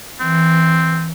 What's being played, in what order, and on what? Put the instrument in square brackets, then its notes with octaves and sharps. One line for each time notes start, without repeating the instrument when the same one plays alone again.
[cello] E3 [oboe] C4